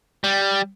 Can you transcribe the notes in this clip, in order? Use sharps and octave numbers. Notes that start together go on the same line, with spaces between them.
G3